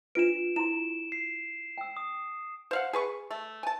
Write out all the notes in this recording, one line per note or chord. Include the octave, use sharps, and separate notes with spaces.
D4 F4 B4 D7 E7
E4 A#5 C6 E7
C7
G5 E6
D#6
C5 F5 F#5
G#4 B4 C#6
A3
G#5 A5